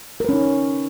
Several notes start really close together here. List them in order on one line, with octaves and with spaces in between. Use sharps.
A#4 B4 C#4 D#4